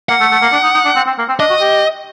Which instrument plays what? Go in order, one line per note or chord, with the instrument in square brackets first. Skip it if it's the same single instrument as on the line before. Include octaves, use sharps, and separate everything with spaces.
[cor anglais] A#3 [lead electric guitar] F#5
[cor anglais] A3
A3
A#3
D4
D#4
D#4
D4
C4
C4
A#3
C4
[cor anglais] D4 [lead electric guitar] D#5
[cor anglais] F#4
G4